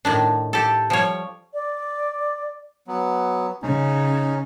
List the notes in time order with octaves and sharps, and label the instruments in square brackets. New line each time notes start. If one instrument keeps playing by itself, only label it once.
[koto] A2 D#3 D4
G4 A4
F3 G3 C#5
[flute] D5
[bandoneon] F#3 B3
[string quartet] C#3 [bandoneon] C#4 D#4